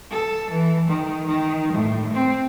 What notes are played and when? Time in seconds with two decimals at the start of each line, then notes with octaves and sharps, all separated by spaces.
0.11 A4
0.51 E3
0.88 D#3
1.26 D#3
1.73 A2
2.13 C4